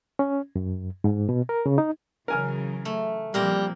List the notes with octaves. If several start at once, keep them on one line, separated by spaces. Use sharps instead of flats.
C#4
F#2
G#2
B2
A#4
C#3
D#4
C#3 E3 F#3 A#4 G#5 F6
A3
A#2 F3 G3 A#3 C4 A#5